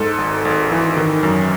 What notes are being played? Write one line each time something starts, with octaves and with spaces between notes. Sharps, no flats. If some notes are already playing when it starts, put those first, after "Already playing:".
Already playing: G#2 A4
G#1
G#1
E3
D#3
F#2